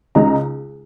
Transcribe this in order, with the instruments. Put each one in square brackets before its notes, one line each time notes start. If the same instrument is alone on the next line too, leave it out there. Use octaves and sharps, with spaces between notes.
[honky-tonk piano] C#2 C#3 G#3 D#4 A#5